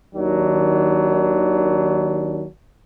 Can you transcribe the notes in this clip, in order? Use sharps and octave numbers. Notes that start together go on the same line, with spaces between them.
D#2 D#3 F#3 D4